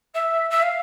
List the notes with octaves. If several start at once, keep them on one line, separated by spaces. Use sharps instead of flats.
E5
E5
F5